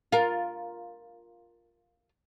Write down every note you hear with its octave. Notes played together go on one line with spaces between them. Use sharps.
F4 A#4